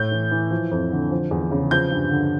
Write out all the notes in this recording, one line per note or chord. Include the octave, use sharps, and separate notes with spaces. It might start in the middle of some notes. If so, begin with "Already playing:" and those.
Already playing: A2 G6
E3
E3
F3
F2
D3
F3
E2
C#3
F3 G6
G2
D3